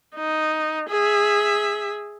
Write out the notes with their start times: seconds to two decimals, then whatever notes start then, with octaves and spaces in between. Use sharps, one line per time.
0.16 D#4
0.89 G#4 E5